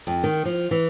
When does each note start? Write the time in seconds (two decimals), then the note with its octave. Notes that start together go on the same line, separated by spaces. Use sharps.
0.07 F2
0.24 D#3
0.45 F3
0.71 E3